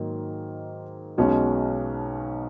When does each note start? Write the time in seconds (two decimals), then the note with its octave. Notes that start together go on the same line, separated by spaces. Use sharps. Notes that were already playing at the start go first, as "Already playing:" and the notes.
Already playing: G#2 D#3 F#3 A#3
1.18 B1 B2 G#3 C#4 F#4